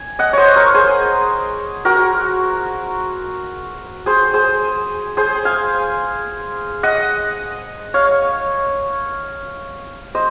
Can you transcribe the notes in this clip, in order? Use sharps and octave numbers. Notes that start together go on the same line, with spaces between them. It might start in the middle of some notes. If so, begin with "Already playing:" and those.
Already playing: G#5
D#5 F#5
C5 C#5 D#5
A#4 C#5
G#4 C5
F#4 A#4
G#4 C5
G#4 C5
G#4 C5
F5 G#5
D#5 F#5
C#5 F5
C5 D#5